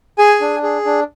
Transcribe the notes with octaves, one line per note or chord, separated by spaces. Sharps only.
G#4 G#5
D4
G#4
D4